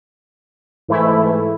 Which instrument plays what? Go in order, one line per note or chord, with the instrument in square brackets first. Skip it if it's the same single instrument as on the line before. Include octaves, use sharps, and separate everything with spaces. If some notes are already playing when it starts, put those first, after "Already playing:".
[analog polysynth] G#2 E3 A3 E4